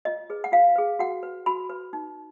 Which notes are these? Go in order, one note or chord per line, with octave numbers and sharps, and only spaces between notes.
F4 D#5
G#4 B4
F#5
F4 F5
G#4 B4
F#4 F#5
B4
F#4 B5
B4
D#4